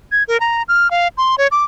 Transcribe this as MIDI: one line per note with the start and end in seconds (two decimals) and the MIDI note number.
0.12 0.23 92
0.28 0.40 70
0.40 0.63 82
0.68 0.90 89
0.91 1.08 77
1.18 1.36 84
1.38 1.48 73
1.51 1.64 86